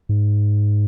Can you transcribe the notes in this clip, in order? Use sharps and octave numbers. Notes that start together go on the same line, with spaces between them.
G#2